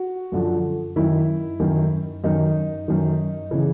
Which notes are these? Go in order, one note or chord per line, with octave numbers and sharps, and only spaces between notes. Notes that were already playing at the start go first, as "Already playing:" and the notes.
Already playing: F#4
F#2 D3 F3
F#2 D#3 E4
F#2 D#3
F#2 D#3 D#4
F#2 D#3
C#3 E3